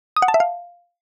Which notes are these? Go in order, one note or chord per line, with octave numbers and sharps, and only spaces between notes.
D#6
F#5
A5
E5
F5